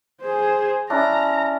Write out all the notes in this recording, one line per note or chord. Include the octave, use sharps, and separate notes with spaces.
G#4 C5
C#4 D4 E4 A#5